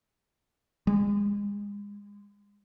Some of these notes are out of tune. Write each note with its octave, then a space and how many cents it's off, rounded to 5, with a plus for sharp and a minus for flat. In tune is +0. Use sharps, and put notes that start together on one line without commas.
G#3 -30